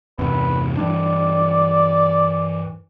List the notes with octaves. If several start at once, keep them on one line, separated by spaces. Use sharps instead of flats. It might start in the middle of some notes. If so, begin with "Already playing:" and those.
E2 G2 C3 B4
E3 G3 D4 D5